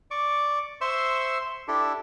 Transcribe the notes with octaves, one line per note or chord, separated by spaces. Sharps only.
D5 C#6 D6
C5 E5 C6 C#6 E6
D4 E4 G4 A4